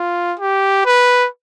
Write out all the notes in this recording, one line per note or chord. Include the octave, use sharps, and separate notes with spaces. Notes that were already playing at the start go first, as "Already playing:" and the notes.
Already playing: F4
G4
B4